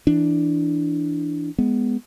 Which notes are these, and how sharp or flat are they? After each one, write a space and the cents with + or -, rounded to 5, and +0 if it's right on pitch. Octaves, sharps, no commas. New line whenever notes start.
E3 +0 D4 +0
G#3 +0 B3 +0